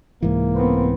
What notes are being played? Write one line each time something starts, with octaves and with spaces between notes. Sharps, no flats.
C2 G#2 E3 A#3
B3 C4